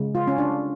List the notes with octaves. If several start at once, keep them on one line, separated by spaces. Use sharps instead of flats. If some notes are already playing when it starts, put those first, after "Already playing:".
Already playing: C#3 G#3
F4
C#4
D4